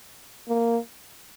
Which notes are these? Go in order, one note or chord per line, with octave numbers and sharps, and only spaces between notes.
A#3